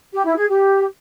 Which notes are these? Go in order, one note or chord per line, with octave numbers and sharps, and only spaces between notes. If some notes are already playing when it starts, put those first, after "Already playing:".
G4
E4
G#4
G4